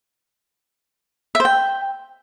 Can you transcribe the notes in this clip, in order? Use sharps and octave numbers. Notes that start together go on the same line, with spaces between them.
E5
C5
G5